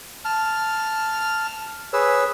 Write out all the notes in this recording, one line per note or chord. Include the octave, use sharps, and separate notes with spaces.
A5 F6
G#4 B4 C#5 E6